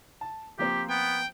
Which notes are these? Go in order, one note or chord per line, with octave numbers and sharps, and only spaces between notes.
A5
F3 A#3 C4 G4
B3 G5